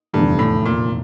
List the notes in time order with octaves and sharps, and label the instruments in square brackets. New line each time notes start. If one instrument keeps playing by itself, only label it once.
[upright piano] F1 E2 D3 A3 [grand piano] G2
[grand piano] A2
A#2